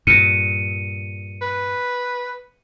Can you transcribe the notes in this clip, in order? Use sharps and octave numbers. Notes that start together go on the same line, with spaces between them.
G2 A#2 C#7 D#7
B4